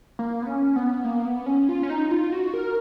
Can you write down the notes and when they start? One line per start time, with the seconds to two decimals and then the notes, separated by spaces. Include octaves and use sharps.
0.19 A#3
0.42 B3
0.47 C#4
0.76 B3
1.04 A#3
1.25 B3
1.46 C#4
1.69 F4
1.83 C#4
1.90 D#4
2.11 F4
2.32 F#4
2.54 A#4